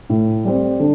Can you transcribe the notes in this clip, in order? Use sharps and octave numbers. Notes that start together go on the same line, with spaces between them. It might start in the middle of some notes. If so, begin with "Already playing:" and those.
A2
G3 C4
D3